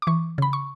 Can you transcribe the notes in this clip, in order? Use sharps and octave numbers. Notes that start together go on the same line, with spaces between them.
D6
E3 C#6
C#3 B5
C#6